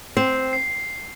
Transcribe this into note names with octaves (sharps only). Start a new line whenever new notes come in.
C4 C7
C7